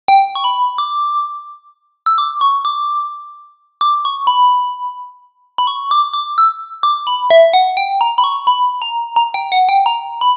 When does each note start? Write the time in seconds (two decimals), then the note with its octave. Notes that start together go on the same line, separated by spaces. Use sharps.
0.08 G5
0.35 C#6
0.44 B5
0.78 D6
2.06 E6
2.18 D6
2.41 C#6
2.65 D6
3.81 D6
4.05 C#6
4.27 B5
5.58 B5
5.67 C#6
5.91 D6
6.14 D6
6.38 E6
6.83 D6
7.07 B5
7.30 E5
7.53 F#5
7.77 G5
8.01 A#5
8.18 B5
8.24 C#6
8.47 B5
8.82 A#5
9.16 A#5
9.34 G5
9.52 F#5
9.69 G5
9.86 A#5
10.21 B5